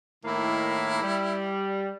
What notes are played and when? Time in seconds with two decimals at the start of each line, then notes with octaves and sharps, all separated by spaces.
0.25 A2 D#3 A#3 E4
1.03 G3